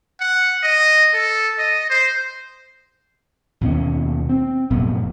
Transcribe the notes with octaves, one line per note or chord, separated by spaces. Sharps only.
F#5
D#5
A4
D#5
C5
D#2 B2 B3 C#4
C4
F1 F#2 A#2 B3